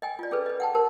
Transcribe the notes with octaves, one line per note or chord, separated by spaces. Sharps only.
D#5 G5 G#5
F4 D5
C#4 G#4 A4 B4
B4 D#5
F#5 G5 A5
G4 A#4 C5 A5